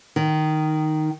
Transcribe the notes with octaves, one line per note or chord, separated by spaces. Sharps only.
D#3